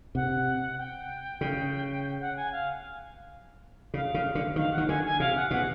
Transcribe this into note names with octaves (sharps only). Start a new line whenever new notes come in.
C3 F#5
G5
C#3
F#5
G#5
F5
C#3 F5
C#3
D3
D#3 F5
F#5
D#3
D3 G#5
G#5
C3 F5
F#5
B2 F#5